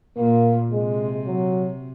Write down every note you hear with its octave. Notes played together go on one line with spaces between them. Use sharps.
A#2 A#3
C3 G#3
F#3